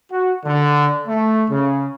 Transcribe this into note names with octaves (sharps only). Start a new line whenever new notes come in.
F#4
D3
A3
C#3